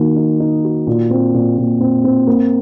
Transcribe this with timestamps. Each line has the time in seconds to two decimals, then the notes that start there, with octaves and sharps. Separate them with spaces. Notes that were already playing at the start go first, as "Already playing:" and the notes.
Already playing: D#3 A#3 F#4
0.16 D#4
0.40 D#4
0.64 F#4
0.87 A#2
1.10 C4
1.34 A#2
1.58 A#2
1.80 C4
2.04 C4
2.27 A#3